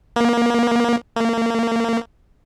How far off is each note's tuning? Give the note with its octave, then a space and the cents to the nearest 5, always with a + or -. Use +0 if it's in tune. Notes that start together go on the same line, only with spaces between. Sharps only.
A#3 +25
A#3 -25